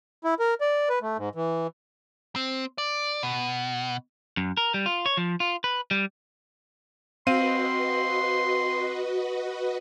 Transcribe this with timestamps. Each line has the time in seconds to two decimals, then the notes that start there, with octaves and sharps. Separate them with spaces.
0.24 E4
0.39 A#4
0.61 D5
0.89 B4
1.02 A3
1.17 G#2
1.35 E3
2.36 C4
2.78 D5
3.23 B2
4.37 F#2
4.57 A#4
4.74 G3
4.86 F4
5.06 C#5
5.17 F3
5.40 F4
5.64 B4
5.91 G3
7.27 C4 F#4 B4 D#5 F5 C6 D#7